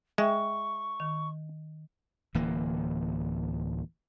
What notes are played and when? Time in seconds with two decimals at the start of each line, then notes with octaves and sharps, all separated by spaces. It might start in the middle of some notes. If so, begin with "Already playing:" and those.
0.18 G#3 E5 G5 C#6
1.00 D#3
2.35 D1 E3 A#3